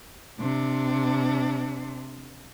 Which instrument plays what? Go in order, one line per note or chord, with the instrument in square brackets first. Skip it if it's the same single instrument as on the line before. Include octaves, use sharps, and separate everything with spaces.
[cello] C3 D4